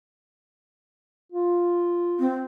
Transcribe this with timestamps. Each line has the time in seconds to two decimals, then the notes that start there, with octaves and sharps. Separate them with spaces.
1.32 F4
2.19 C4